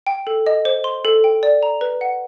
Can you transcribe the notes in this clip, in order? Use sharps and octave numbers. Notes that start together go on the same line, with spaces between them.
G5
A4
D#5
C5
C6
A4
G5
D5
A#5
B4
F#5